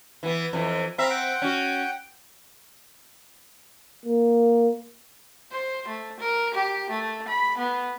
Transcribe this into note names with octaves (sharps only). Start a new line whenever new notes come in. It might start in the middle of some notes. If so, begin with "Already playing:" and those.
E3 B3
F2 E3
C4 E5 F5 A#5 B5
F#5 G5
C#4 F#4
A#3
C5
A3
A#4
G4
A3
B5
B3